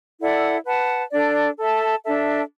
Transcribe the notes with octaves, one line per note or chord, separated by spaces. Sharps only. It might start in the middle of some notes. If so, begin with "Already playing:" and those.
E4 A4 D5 F#5
B4 F#5 A5
D4 A4 D5
A4 E5 A5
D4 A4 E5